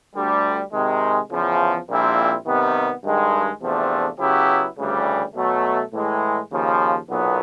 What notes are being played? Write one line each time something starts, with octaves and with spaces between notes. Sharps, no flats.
D2 D3 G3
C3 D#3 G#3
E2 C#3 F3
A#1 A#2 G3 C4 E4
C3 D#3 G3 B3
G2 D#3 G#3
E2 C3 F3 A3 D4
C#3 F#3 B3 E4 G4
D2 C#3 E3 G3
B2 F#3 A3
A2 E3 G#3
D#2 C#3 F3
B1 A#2 F#3 B3